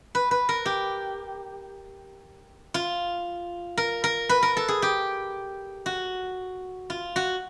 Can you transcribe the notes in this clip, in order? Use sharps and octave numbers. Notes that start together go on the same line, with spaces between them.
B4
B4
A#4
G4
F4
A#4
A#4
B4
A#4
A4
G#4
G4
F#4
F4
F#4